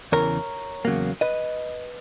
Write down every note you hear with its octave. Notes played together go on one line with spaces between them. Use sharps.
E2 C#3 E3 A#4 C#5
E2 C#3 F#3 A#3
B4 D#5